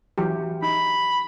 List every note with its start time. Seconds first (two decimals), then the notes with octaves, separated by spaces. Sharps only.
0.18 E3 F#3 G4
0.63 D#4 B5